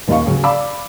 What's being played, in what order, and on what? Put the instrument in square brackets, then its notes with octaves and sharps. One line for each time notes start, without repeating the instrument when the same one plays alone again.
[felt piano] D#1 D#2 D#5 F5 C#6
C#3 F#3 C#4
D5 F5 A5 B5 D6 E6